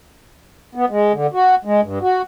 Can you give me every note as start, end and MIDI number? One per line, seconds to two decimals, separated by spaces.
0.75 0.85 59
0.90 1.12 56
1.13 1.27 50
1.33 1.55 66
1.65 1.81 56
1.83 1.99 43
2.02 2.22 66